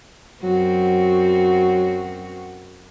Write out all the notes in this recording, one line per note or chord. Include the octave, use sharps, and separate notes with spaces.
F#2 F#3 C4 F#4